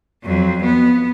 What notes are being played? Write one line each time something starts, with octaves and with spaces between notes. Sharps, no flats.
F2 F#3
B3